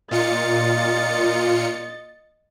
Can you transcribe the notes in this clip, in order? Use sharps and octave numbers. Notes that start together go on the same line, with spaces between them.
A#2 F4 D#5 A6 C#7